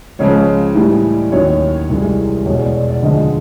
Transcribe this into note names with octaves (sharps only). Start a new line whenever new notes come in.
C#2 C#3 F3 G#3 C#5
A2 E3 G3
D#2 D#3 F#3 C#5
C2 C3 E3 G#3
E2 B2 G#3 C#5
D5
D5
D5
D2 D3 F3 G#3 D#5